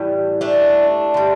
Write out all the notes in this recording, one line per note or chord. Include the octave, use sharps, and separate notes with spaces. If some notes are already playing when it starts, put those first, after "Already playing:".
Already playing: A2 E3 G3
A3 D4
D3 G3